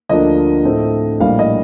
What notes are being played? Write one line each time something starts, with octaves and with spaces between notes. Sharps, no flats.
D2 D3 F3 A#3 D4 D#5
A2 A3 C4
A#1 A2 G3 A#3 F5
D#5